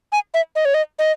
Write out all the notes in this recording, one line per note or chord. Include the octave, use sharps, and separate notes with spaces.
G#5
E5
D#5
C#5
D#5
D#5